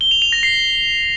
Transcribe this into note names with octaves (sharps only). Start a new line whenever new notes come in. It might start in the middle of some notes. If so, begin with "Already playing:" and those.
G7
F7
F7
A#6
C7